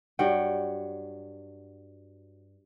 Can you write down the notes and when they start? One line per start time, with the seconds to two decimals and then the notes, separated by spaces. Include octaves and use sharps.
0.19 G2 F#3 F#5 G5